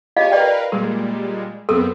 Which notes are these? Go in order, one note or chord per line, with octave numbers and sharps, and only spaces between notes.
F4 G4 C#5 D#5 F5 G#5
A#4 B4 D5 F5 G5
A#2 G3 G#3 A#4
F#2 B3 C4 A4 A#4 E6